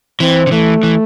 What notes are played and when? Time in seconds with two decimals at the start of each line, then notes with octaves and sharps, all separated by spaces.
0.20 E3 C4
0.47 D3
0.51 E3 A3
0.83 E3